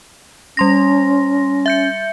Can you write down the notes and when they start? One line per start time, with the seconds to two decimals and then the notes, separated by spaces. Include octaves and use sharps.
0.57 G3 C#4 C6 A#6
1.66 E5 G6 C#7